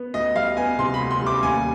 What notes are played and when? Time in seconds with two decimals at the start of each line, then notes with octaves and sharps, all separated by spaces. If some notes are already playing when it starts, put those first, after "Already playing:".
Already playing: B3
0.14 D2 D#5
0.35 G3 F5
0.57 B3 G#5
0.78 C3 C6
0.94 B5
1.00 D2
1.11 C6
1.21 G3
1.26 D6
1.43 D#2 G#5